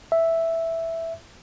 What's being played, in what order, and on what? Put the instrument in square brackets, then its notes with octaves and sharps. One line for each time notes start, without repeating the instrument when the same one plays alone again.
[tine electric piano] E5